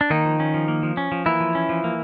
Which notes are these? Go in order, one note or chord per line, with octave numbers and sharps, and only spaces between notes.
D4
D#3 A#3 D#4
F3
C#4
F3
A#3
F3
C#4
F3
E3 A#3 E4
F3
C#4
F3
A#3